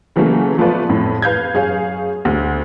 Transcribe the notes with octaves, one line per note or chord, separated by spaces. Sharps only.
C#3 E3 F#3 G3 A3 A#3
F3 A3 B3 F4 B4 D5
F2 A2
B4 F5 G6 G#6
F#2 G#4 C#5 F5
D2